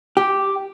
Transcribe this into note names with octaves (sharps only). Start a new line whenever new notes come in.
G4